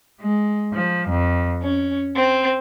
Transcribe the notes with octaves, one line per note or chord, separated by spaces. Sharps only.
G#3
F3
F2
C#4
C4